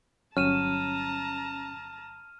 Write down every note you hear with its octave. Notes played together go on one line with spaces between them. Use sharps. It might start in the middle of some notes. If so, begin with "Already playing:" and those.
G1 F#3 C#4 A5 A#5 F6 D#7 E7